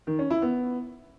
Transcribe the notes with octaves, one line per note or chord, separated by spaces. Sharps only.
D#3
C#4
E4
B3